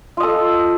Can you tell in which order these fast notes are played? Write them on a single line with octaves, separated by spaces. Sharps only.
F4 D#5 A4